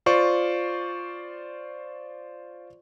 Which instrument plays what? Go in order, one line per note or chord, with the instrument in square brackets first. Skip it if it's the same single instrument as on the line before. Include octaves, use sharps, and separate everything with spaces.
[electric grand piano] F4 C5 D5 C#6